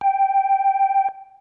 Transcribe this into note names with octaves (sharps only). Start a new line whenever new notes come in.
G5